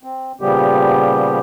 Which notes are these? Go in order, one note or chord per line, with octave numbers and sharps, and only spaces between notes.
C4
A#2 C#3 F3 G3 B3 G4